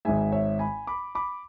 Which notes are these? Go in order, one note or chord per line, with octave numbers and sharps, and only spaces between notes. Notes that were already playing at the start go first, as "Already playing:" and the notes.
G#1 G#2 G#3 E5 G#5
C#5 E5
G#5 B5
B5 D6
B5 D6